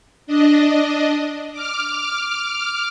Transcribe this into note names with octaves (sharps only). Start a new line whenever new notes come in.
D4 D#5
D6 F6